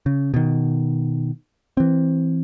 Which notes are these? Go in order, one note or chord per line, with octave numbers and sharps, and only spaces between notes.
C#3
B2 D#3
E3 C4